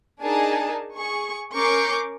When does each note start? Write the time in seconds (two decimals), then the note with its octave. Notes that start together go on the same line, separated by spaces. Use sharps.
0.21 D4 D#4 G#4 A#4 G#5 A5
0.95 G#4 C#6
1.54 C#4 A#4 C#6 D6 G6 C7